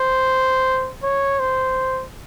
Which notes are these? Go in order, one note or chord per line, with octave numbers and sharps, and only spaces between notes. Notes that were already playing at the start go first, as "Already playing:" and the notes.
Already playing: C5
C#5
C5